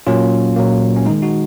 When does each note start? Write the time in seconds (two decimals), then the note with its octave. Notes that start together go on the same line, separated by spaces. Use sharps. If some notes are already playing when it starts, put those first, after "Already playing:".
0.07 A#2 F#3 A#3 C#4 F4
0.56 A#2 F#3 A#3
0.96 C#4
1.05 G#3 D#4
1.10 D#3
1.22 D#4 F#4